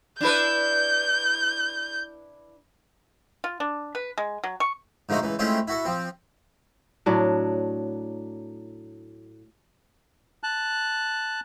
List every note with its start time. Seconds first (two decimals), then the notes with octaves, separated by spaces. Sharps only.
0.21 D4 E4 B4 G6
3.44 F4
3.60 D4
3.95 B4
4.18 G#3
4.44 F#3
4.60 C#6
5.09 G#2 D3 F3 A3 D#4 F#4
5.23 C#2 E3
5.39 G#3 A3 C4 C#4 E4 F4
5.68 E4 F#4 A4
5.85 F3 C4
7.06 A2 F#3 D4
10.43 A5 F#6